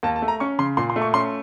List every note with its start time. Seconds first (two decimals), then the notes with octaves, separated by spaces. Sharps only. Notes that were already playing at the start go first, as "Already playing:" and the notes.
0.03 D#2 A5
0.16 A5
0.22 A3
0.28 A#5
0.40 C#4 C#6
0.59 C#3 C6
0.77 A#2 C6
0.90 C6
0.96 A3
1.02 C#6
1.14 C#4 C6